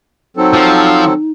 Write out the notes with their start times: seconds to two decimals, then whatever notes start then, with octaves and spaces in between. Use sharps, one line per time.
0.37 F#3 C4 D#4 A4
0.54 F3